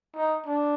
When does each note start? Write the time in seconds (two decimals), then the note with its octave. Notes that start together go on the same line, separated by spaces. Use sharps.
0.15 D#4
0.46 D4